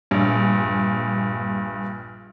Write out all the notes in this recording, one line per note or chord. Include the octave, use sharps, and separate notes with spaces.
A#1 G2